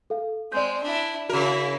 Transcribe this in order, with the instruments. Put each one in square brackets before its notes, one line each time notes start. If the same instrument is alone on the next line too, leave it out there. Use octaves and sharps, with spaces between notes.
[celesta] A4 F5
[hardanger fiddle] G#3 C4 [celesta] D5 G6
[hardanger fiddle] D4 E4
[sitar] C#3 A#4 [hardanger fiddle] E4 [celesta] F#4